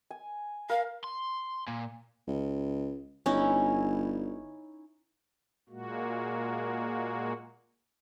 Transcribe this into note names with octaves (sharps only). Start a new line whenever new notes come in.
G#5
A#4 F5
C6
A#2
C#2
G1 C#4 D#4 E4
A#2 G#3 A#3 F#4